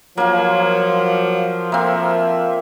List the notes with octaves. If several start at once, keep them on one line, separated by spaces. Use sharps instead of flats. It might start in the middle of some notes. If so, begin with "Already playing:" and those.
F3 F#3 A#3 F4
A#3 C4 E5